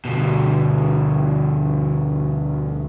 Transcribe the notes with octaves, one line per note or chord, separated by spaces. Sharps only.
D2 B2